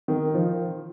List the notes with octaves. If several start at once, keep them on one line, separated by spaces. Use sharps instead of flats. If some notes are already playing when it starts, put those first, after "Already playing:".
D#3
F3